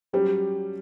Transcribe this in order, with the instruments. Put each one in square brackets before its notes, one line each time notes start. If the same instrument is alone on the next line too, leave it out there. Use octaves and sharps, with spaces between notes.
[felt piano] F#3 C#4 G4 C#5 [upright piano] G3